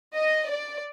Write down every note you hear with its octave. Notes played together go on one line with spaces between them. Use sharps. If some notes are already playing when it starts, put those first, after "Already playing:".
D#5
D5